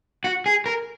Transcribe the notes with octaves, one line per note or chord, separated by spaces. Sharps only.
F#4
G#4
A#4